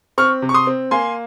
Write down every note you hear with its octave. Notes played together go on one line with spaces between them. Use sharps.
C4 C#6 F6
C3
C#6
C6 D#6
C4
A#3 G#5 C6